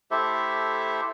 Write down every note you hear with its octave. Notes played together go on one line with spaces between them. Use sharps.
A3 E4 G4 A4 C5 E5